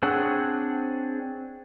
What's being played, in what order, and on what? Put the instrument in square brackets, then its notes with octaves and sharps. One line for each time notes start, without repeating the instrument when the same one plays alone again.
[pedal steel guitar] C4 D4 G#4 C#5 F#5